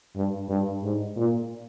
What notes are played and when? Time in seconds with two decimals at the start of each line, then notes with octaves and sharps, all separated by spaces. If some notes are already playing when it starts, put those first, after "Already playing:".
0.16 G2
0.49 G2
0.83 G#2
1.17 A#2